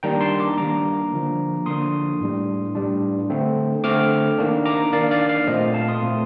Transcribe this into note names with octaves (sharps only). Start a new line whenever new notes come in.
D#3 G3 A#3 D4 G5 A#5
A5 C6
A#5 D6
D#3 G3 A#3 D4 A#5 D6
D3 F3 A#3 D4
D3 F3 A#3 D4 C6 D#6
A2 G3 D4
A2 G3 D4
D3 A3 C4
D3 A3 C4 D6 F6
D#3 A#3 D4
A#5 D6
D#3 A#3 D4 D5 F5
D5 F5
D5 F5
A#2 A3 C4 C5 D#5
D5 F5
F5 A5
C6 D#6
A#2 A3 C4